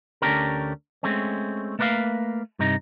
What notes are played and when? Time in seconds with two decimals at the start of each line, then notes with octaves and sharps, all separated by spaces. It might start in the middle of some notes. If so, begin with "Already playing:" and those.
0.22 D2 A3 C#4 D4 G4 A#4
1.03 G#3 A3 C4 C#4
1.79 A3 A#3 B4 C#5 F5
2.59 G2 C3 D#4